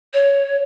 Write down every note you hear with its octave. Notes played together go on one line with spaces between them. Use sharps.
C#5